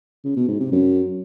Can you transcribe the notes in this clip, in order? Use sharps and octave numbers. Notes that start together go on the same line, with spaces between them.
C#3
B2
G#2
C3
F#2